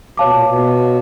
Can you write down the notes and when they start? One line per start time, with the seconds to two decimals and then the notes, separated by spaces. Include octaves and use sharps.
0.17 B2 C#5 F5 A5 D6
0.30 A#2
0.43 B2